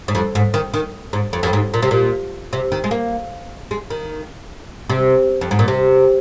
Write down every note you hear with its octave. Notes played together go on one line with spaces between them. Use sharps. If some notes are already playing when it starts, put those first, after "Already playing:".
G#2
F2
G#2
D#3
D#3
G#2
F2
F2
G#2
A#2
C3
A#2
C3
D#3
G#3
A#3
G#3
D#3
C3
F2
G#2
A#2
C3